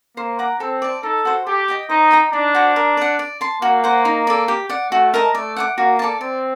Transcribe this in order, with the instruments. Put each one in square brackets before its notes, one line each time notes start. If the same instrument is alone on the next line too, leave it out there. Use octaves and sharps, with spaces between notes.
[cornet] A#3 [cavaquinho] C5
[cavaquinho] F#5 A#5 D6
[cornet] C4 [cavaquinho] A4
[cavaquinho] D5 A5
[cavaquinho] D#4 [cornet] A4
[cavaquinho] F#4 C5
[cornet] G4 [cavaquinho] A4
[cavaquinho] D#5 G5 D6
[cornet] D#4 [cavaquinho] C5
[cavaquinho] D#5 G5 A#5
[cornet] D4 [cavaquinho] D#4
[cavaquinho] F#4 C5 G5
A#4
D5 F#5
D5
A5 C6
[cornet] A#3 [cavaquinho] F#4
[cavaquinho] C5 F#5
D#4
A4 D5
G4
D5 F#5
[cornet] A3 [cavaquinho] F#4
[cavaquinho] A#4 D#5 A5
[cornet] A3 [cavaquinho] D5
[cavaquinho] F#5 A5 D6
[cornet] A#3 [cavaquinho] F#4
[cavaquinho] A4 D5 A5
[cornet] C4 [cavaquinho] D5